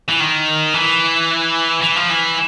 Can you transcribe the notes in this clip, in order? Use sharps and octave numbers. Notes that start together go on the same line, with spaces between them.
E3
D#3
E3
E3
F3
E3